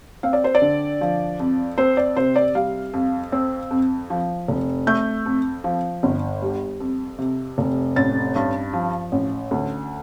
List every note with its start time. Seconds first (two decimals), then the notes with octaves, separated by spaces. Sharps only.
0.23 C4 F5
0.33 D5
0.44 C5
0.55 D5
0.62 D3
1.01 F3
1.40 F2
1.78 C4 C5
1.97 D5
2.16 C3 C5
2.36 D5
2.55 G3 F5
2.93 F2
3.32 C4
3.71 F2
4.10 F3
4.48 F1
4.87 A3 G6
5.26 F2
5.64 F3
6.03 G1
6.42 G3
6.80 F2
7.18 C3
7.58 F1
7.96 A1 A6
8.36 G2
8.73 F3
9.12 A1
9.51 D2